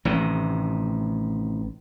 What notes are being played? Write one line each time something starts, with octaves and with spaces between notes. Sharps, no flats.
A1 A2 C3 D#3